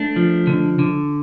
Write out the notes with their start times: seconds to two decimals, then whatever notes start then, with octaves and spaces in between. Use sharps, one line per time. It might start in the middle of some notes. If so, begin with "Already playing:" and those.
Already playing: A3 D4
0.16 F3
0.47 D3
0.79 D3